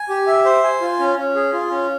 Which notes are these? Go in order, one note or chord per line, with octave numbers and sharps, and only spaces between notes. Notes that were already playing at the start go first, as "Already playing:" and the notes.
Already playing: G#5
G4
E5
C5
G#5
F4
C#4
C#4
G#4
F4
C#4